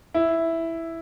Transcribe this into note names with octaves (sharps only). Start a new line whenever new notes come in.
E4